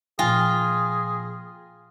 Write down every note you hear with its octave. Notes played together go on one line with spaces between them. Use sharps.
A#2 F3 F4 G#4 G5 G#5 A#6